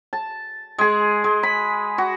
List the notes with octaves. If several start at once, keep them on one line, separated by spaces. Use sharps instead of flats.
A5
G#3 G#4
G#3
B5
F#4